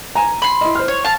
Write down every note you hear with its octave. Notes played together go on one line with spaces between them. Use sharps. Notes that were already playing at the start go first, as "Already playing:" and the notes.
G#5 A#5
B5 C6
E4 D#5
C5 F6
C#5
F5 A5